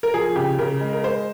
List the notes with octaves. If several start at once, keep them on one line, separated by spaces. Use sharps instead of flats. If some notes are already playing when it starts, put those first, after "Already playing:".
A#4
F3 G#4
C#3 G4
C#3 A#4
G#3
A#4
G#3 C5